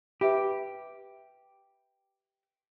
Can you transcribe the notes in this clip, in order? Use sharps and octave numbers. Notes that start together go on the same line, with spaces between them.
G4 B4 E5 B5